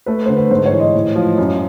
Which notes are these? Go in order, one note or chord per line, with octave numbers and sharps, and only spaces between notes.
A3 B4
D3 C5
B4
G#2 C5
C#5
E3
D#5
A2
F3
F#2